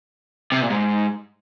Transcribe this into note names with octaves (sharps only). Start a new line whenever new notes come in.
C3
A#2
G#2